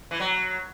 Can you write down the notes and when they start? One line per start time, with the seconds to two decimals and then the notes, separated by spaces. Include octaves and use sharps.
0.11 E3
0.20 F#3